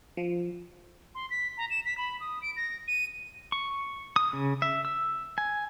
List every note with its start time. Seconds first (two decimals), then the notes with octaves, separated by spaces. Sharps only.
0.17 F3
1.15 C6
1.30 B6
1.57 A#5
1.70 E7
1.85 B6
1.98 B5
2.20 D#6
2.42 D7
2.57 A#6
2.88 D#7
3.52 C#6
4.16 D#6
4.33 C#3
4.62 E5
4.85 E6
5.38 G#5